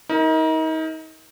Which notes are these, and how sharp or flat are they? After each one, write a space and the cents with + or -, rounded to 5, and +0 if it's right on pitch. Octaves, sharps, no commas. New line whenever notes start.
D#4 +35 A#4 +0